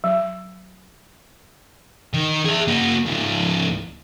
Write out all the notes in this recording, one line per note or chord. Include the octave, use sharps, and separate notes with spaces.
F#3
D#3
G#4 E5
A#3 F#4
C#2 F3